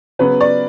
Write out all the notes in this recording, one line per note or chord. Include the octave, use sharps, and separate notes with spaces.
C#3 F#3 B3 B4
D5